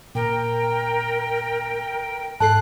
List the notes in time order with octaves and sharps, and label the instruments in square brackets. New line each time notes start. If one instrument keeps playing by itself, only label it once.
[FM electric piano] A#2 [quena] A#4 [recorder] G5
[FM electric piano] G#2 A4 C7 [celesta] A5 [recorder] F#6